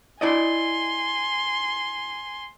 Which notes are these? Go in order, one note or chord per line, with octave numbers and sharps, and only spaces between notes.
E4 D5 D#5 G#5 C6